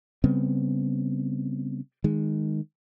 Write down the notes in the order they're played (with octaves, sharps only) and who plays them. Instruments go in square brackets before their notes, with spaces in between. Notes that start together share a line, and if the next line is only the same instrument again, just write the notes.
[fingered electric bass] C#3 G3 B3 C4
D#3 G#3